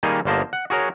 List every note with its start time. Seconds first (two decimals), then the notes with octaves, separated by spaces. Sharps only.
0.03 D#3 G3 A#3 D#4 G#4
0.25 G1 D3 A#3 C5 D#5 A5
0.53 F#5
0.70 F#4 G#4 A#4 C#5